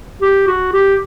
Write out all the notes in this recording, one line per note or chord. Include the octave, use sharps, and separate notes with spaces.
G4
F#4
G4